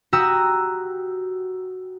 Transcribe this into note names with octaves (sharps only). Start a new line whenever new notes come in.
F#4 G4 A#5 D#6 E6